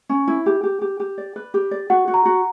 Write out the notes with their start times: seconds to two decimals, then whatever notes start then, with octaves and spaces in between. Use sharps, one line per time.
0.09 C#4
0.28 E4
0.46 G4
0.63 G4
0.82 G4
1.00 G4
1.18 D5
1.36 B4
1.54 G4
1.71 D5
1.90 F#4 F#5
2.08 F#4
2.14 A#5
2.26 F#4